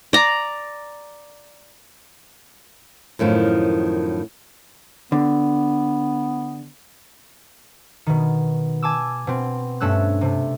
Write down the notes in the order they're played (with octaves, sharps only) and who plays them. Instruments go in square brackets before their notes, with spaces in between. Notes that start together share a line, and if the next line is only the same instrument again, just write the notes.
[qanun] D5 A#5
[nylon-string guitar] F#2 A2 D#3 F3
[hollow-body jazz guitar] D3 [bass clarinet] B3
[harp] B2 D#3
G#5 A5 D6 E6
B2 C4
G2 A3 C#4 E6 F#6
C3 A3